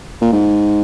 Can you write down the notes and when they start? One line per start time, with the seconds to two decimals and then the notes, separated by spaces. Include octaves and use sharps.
0.21 A#2
0.33 G#2